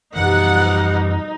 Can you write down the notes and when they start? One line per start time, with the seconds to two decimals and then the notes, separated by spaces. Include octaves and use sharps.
0.16 F#2 B2 E3 F3 G3 D#4 F#5